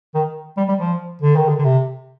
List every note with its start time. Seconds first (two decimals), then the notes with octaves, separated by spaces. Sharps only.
0.15 D#3
0.57 G3
0.68 G3
0.79 F3
1.22 D3
1.36 D#3
1.49 D3
1.59 D3
1.64 C3